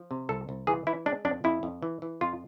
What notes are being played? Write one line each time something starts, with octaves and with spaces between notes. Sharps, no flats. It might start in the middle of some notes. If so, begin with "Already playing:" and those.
Already playing: F3
C3
C2 A4
C2
E3 G#4
E3 E4
G#3 D4
F2 D4
F2 E4
F2
E3
E3
F2 F4